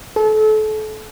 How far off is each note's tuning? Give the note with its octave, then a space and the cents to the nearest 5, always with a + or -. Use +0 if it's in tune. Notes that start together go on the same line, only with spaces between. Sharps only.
A4 -30